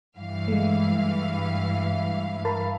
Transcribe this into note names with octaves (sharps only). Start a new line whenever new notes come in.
G2 E3 F5
G#3 A3
A#4 A5 B5